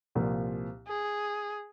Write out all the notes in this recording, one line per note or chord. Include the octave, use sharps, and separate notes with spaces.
C2 A#2 F3 A#3
G#4